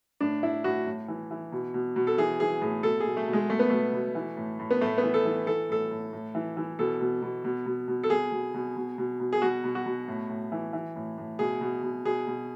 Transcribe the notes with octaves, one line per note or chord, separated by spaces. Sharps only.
A2 D4
A2 E4
A2 F#4
A2
E3
E3
B2
B2
B2
A4
E3 G#4
E3 G#4
A2 G#4
B2 A4
G#4
B2
A3
B2
G#3
B2 A3
B3
B2 A3
B2
E3
A2
A2
B3
A2 A3
B3
E3
A4
E3
E3 A4
A2 A4
A2
A2
E3
E3
B2 A4
B2
B2
B2
B2
B2
A4
B2 G#4
B2
B2
B2
B2
B2
G#4
B2 F#4
B2
F#4
B2
A2
A2
E3
E3
A2
A2
B2 G#4
B2
B2
B2 G#4
B2